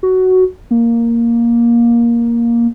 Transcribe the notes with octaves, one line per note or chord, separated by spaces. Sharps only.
F#4
A#3